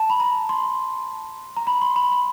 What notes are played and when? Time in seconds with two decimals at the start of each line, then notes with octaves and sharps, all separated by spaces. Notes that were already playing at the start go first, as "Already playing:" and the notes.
Already playing: A5
0.10 B5
0.20 A#5
0.49 C6
1.57 A#5
1.67 B5
1.82 C6
1.96 B5
2.12 B5